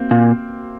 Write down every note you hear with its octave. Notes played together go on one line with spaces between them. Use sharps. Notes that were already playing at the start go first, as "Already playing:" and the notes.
Already playing: A#3 C4
A#2